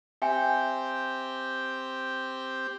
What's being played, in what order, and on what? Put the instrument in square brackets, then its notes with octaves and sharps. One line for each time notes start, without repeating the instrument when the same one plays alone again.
[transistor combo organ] C4 G4 [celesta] E5 G5 G#5